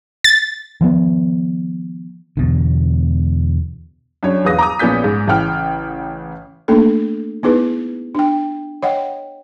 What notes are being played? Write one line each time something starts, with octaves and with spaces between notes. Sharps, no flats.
A6
D#3 F3 G#3 B3
E2 B2 D3
F#2 D4 C#5
E1 B4 F5 D#6 A#6
A#5 D6 D#6
A#1 A#2 B3 C#4 G6 B6
G#2
A1 C#3 F#5 G5 F6
A3 A#3 C#4 D4 A4
B3 D#4 E4 G#4 B4
D4 G5
C#5 D#5 F#5 G5